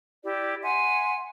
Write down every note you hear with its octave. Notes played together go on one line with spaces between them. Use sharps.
E4 G4 D5
E5 F#5 G#5 C6